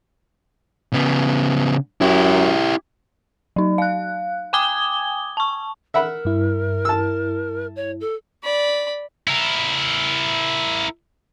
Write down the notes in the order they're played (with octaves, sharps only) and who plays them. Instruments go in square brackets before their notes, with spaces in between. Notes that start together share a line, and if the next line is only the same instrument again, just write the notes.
[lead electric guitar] C#3 B3
[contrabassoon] F#2 [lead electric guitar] E4 G4
[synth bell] F#3 D#4
F5 F#6
G5 G#5 D6 D#6 G#6 G7
A5 C#6
[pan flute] A#4 [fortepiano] E5 F#5 B5
[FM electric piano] G2 E4
[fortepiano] A5 E6
[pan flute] C#5
A4
[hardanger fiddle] D5 B5
[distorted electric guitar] E4 A#4